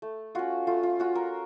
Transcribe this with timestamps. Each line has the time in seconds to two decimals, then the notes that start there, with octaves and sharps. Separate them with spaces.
0.02 A3
0.35 C#4 F4 F#4
0.67 A3 F4
0.83 F4
0.99 C#4 F4 F#4
1.15 A#4